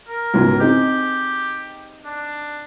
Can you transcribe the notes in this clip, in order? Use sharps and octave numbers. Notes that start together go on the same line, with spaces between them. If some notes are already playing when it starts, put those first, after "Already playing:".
A#4
C#2 G#2 B2
C4 D#4 G4 G#4
D4